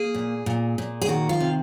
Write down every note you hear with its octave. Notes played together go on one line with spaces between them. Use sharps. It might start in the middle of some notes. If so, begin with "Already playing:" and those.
Already playing: A#3 G#4
A#2
A#2
A#2
G#4
D#3 F#4
F4
C3